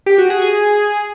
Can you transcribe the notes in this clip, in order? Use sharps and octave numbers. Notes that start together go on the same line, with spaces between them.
G4
F#4
G#4
G#4